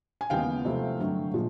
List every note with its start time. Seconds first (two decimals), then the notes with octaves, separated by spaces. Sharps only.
0.21 G#5
0.30 D#2 C#3 E3 G#3 B3 F5 G5
0.65 C3 F3 A3 C4 E4
0.99 G2 D3 F#3 A3
1.34 A#2 F3 G#3